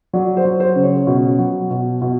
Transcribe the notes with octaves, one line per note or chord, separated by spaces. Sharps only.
F#3 D5
C5
F#3
C5
C#3
C#5
B2
F#3
B2
B2